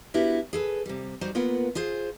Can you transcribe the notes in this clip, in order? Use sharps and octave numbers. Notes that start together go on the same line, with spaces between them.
B3 D4 E4 F#4 G4 A#4
G#4 A4 B4
C3 G3
G3 D#4 F#4 C5 D5
A#3 B3 F4 A#4 B4 F#5
F4 G#4 C5